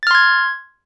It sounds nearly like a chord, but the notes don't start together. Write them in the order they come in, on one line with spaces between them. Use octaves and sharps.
A6 F6 C6 G#6